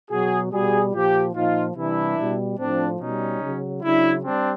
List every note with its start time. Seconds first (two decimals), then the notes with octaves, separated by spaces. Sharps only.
0.11 B2 F#3 F#4 G#4
0.52 B2 G3 F#4 G#4
0.94 A#2 F3 F4 G4
1.35 A#2 F3 D#4 F4
1.76 C3 E3 G3 D4 E4
2.18 B2 G3
2.59 A2 F3 C4 D4
3.00 B2 G3 C#4 D#4
3.42 C#3 F#3
3.83 C#3 F#3 D4 E4
4.24 G3 C4 D4